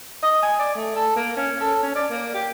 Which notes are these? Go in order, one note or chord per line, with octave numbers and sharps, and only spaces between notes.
D#5
G#5
D5
A3
A4
A#3
C#4
A4
C#4
D5
A#3
G4